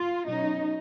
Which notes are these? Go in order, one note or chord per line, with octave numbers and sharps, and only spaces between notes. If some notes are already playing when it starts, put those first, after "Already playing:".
Already playing: F4
B2 F#3 C#4 D#4